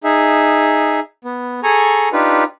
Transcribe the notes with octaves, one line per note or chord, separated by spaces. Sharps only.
D#4 G#4 E5
B3
G#4 A4 G#5 A#5 C#6
D4 D#4 F4 G4 B4